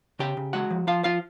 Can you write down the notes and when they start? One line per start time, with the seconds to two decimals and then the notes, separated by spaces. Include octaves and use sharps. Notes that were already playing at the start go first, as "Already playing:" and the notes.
0.19 C#3 G4 G5
0.37 C#3
0.53 G#3 F#4 F#5
0.70 F3
0.87 F3 F4 F5
1.04 F3 F4 F5